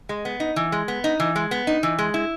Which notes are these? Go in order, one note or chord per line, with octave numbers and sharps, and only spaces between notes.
G#3
B3
D#4
E3
G#3
B3
D#4
E3
G#3
B3
D#4
E3
G#3
E4